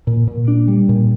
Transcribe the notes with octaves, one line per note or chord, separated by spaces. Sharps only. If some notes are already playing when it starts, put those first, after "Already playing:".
A#2
A#2
D4
G3
A#2